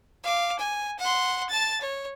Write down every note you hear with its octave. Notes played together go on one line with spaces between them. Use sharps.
F5 D6
G#5
F#5 C6
A5 A6
C#5